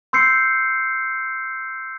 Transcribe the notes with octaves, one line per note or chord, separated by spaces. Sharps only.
C6 E6 G6 C7 C#7